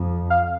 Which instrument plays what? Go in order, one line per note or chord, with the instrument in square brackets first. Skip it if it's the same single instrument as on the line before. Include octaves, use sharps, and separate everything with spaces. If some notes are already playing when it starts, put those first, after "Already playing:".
Already playing: [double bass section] F2
[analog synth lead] F5